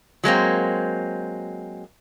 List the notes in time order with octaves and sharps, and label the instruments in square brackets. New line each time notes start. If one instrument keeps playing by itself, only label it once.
[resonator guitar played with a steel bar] F#3 G#3 A#3 C4